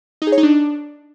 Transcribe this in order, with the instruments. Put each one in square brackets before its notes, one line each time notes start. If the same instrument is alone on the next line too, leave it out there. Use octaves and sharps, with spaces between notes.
[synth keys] D#4
G#4
C#5
D#4
D4